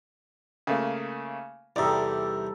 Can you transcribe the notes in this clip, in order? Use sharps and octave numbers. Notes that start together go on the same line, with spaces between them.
C#3 A3 A#3
E2 C3 G3 D#4 A4 D5